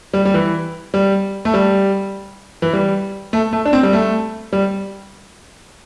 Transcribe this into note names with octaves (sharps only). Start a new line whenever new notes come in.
G3
G3
E3
G3
A3
G3
E3
G3
A3
A3
D4
C4
G3
A3
G3